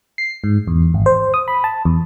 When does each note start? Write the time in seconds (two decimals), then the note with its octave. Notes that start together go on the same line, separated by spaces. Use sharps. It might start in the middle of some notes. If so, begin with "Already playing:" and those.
0.18 C7
0.44 G#2
0.67 E2
0.94 G#1
1.06 C5
1.34 D#6
1.48 B5
1.64 A5
1.85 E2